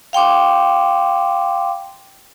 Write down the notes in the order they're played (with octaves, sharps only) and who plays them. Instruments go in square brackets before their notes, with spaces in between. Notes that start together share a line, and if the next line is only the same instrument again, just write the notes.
[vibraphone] F5 G5 C6 D6